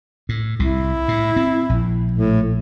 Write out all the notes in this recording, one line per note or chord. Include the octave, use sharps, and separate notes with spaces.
A2
C2 C3 E4
A2
C4
A#1
A2